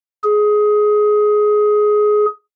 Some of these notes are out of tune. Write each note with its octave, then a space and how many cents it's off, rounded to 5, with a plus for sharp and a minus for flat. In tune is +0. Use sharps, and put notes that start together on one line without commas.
G#4 +15